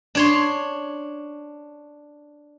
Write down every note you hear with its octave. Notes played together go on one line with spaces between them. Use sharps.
D4 C#5 C6